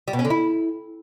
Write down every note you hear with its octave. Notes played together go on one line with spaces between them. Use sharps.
G3
B2
C#4
D3
E4